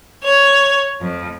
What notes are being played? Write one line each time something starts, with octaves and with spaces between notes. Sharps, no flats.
C#5
F2